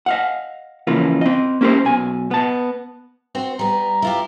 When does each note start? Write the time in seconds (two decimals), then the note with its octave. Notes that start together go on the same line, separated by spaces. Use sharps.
0.06 D#5 F5 F#5
0.87 C#3 E3 F3 A#3 F4
1.21 C4 D#5
1.61 A#3 C#4 G4 A#4 C5
1.85 B1 B2 G#5
2.31 B3 A5
3.35 C4 F#4 C5
3.59 G3 B3 A#5
4.02 E4 F4 G4